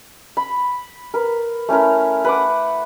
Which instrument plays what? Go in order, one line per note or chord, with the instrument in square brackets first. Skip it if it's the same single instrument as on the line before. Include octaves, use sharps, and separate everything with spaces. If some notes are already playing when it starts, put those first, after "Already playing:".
[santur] B5
A#4 B4
A3 C#4 E4 A#4
B4 F#5 D6